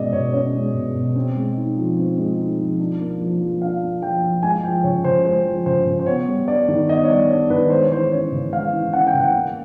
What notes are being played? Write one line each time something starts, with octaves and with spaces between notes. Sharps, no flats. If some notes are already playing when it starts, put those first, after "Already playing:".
Already playing: B2 G#3 C#4 D5 D#5
B2 C#5
C#4 C#5
G#3
B2
B2
C4
G#3
D#4
F3
C4
G#3
D#4
F3
D4
A#3
F3
F3
D4 F5
A#3
F3 G5
F3
G#3 G#5
F3 G5
C#3 C#5
C#3 C5
G#3 C5
F3
C#3 C5
C#3
C5
B3 C#5
G3
D4 D5
D#3
B3 D#5
C#5
G3 D5
D4 C#5
D#3 B4
G#3 C5
C#5
E3 C5
C#4 C#5
C#3
G#3 F5
E3
C#4 F#5
G5
C#3
F#5
A#3